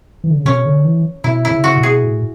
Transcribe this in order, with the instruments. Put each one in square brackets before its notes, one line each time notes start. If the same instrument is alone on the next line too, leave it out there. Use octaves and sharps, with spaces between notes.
[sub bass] E3
D3
C#3
[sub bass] B2 [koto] C#4
[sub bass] D3
E3
[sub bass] B2 [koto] E4
[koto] E4
[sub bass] C#3
[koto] F#4
[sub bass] B2
[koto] G#4
[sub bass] A2